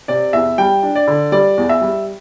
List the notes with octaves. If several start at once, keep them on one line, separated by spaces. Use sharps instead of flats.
C3 D5
E2 E5
G3 G5
D4
D5
D3
G3 D5
E2
E5
G3